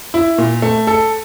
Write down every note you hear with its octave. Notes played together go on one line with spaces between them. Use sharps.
E4
A#2
A3
A4